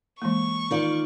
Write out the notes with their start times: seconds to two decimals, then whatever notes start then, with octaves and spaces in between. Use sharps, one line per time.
0.22 E3 G#3 A#3 C#6
0.71 D#3 F4 D5